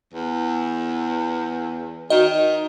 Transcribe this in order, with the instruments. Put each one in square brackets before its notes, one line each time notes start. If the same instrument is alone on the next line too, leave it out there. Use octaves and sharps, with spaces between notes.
[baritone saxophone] E2
[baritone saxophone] D#3 [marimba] D#4 F#4 [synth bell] D#5